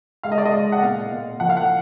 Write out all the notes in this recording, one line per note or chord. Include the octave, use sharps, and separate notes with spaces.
G#3 F5
D#5
D5
D#5
G#3
F#5
A#2 F5
A#2
F3 F#5
F5
F#5